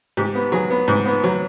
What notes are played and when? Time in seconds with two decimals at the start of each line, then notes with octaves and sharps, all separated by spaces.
0.17 G#2 G4
0.35 B3
0.52 F#3 G#4
0.70 B3
0.88 G#2
1.06 B3
1.24 F#3